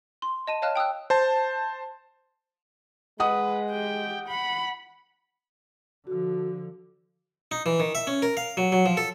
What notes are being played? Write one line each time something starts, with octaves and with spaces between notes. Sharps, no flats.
C6
D#5 A5 D#7
C#5 D#5 F5 A5 F6 F#6
G5 D#6 E6 F#6
C5 A5
G#3 B4 D#5 F#5 D#6
G4 G5
F#5 B5
D3 F3 F#4
D#4
E3
D#3
E5
C#4
A#4
F5
F#3
F#3
F3
A4